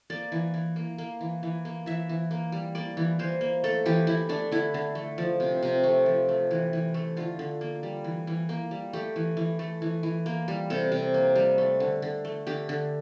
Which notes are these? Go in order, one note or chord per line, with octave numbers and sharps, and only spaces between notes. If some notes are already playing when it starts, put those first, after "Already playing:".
A#3 D5
E3
E3
A#3
A#3
E3
E3
A#3
E3 E5
E3
A#3
G3
A#3 D5
E3
E3 C5
A#3
A3 A4
E3 G4
E3 E4
A3 D4
D3 E4
D3
A3
F3
C3
C3
A3
F3
A3
E3
E3
A3
D3 F4
D3
A#3
G3
E3
E3
A#3
G3
A3 G4
E3
E3
A3
E3
E3
A#3
G3
C3 A4
C3
A#3
G3
A3
D3
D3
A3
D3 G4
D3